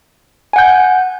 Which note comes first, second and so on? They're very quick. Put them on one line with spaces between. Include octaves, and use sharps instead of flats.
G#5 F#5 G6